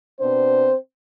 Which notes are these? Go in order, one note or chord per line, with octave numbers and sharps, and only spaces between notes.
B2 B3 C4 D4 C5